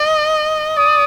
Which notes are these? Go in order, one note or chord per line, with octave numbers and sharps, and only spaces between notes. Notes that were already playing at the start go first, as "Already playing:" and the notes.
Already playing: D#5
D5 D#6